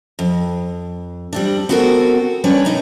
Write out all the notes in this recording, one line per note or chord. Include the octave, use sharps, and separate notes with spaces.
F2
G3 C4 D4
B3 C4 F#4 A4 A#4
G3 C#4 D4 B4 C#5
B2 D#4 A#5